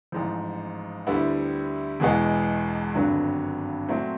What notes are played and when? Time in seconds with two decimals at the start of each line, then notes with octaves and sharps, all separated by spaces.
0.12 A1 G#2 F3
1.07 D2 D3 G3 B3 E4
2.00 E1 E2 B2 G#3 B3
2.95 G#1 G2 D3 F#3 B3
3.88 A#2 F#3 A3 C4